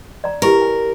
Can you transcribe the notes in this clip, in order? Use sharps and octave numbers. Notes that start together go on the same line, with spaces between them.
D5 A#5
E4 G4 A#4 B4
G#5